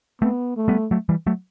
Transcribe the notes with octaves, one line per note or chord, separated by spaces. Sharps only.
A3 B3 C4
A3
G3 B3
F#3 A3
E3 G3
F#3 A3